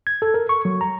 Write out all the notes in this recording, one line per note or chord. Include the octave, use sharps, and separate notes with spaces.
G#6
A4
A#4
C#6
F#3
A#5